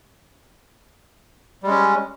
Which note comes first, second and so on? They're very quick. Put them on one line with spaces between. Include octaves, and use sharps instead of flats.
G3 G#3 C#4